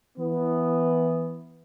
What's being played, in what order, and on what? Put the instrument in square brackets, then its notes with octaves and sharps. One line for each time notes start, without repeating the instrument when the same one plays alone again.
[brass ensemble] E3 B3